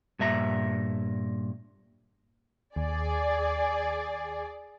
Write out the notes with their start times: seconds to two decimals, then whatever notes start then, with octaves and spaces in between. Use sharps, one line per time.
0.19 G2 A#2 E5 A#5
2.76 D#2 G#4 D5